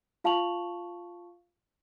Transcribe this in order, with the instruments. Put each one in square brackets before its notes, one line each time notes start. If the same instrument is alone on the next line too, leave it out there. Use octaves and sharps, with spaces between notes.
[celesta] F4 F5 A5 C#6 F7 F#7